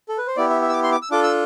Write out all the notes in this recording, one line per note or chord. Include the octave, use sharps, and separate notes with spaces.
A4
B4
C5
B3 E4 G4 D5
E5
E5
E6
D6
C6
D6
E6
D4 F4 A4 D6
E6